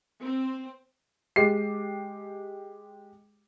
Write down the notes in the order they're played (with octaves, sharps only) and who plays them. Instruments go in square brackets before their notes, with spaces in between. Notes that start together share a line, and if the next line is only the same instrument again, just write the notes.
[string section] C4
[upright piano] G#3 G4 C7